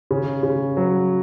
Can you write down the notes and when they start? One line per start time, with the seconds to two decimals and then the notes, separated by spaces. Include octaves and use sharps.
0.11 C#3
0.43 C#3
0.77 F#3